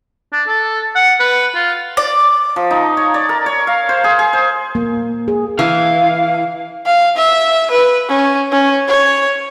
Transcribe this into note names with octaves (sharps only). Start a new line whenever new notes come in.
D4
A4
F#5
B4
F4
D5
F3
D#4
C#5
D5
A#4
C#5
F5
C5
G#4
G#4
C5
A#3
G#4
E3 F5
F5
E5
B4
C#4
C#4
C#5